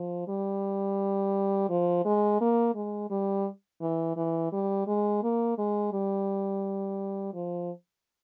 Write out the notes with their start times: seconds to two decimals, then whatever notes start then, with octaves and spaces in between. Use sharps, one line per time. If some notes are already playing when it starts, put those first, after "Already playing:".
Already playing: F3
0.28 G3
1.70 F3
2.05 G#3
2.41 A#3
2.75 G#3
3.10 G3
3.82 E3
4.17 E3
4.53 G3
4.87 G#3
5.23 A#3
5.58 G#3
5.93 G3
7.34 F3